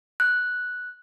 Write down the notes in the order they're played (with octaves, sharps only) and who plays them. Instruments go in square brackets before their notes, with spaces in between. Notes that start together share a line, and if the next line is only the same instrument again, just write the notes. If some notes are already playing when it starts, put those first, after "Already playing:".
[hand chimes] F#6